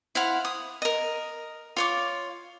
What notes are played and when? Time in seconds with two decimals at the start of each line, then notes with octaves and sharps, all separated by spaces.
0.15 E4 C5 F5 F#5
0.45 D#6
0.82 A#4 D#5
1.76 F4 C#5 D6